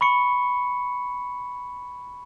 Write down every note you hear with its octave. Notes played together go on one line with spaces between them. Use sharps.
B5 C#6 C#7